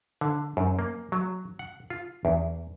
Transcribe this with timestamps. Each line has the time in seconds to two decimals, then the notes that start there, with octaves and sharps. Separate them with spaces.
0.21 D3
0.57 F#2
0.79 A#3
1.12 F#3
1.59 F#5
1.90 F4
2.25 E2